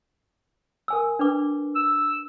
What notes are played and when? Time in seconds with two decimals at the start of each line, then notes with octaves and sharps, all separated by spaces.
0.88 A#4 G#5 E6
1.19 D4 B4 D6
1.76 E6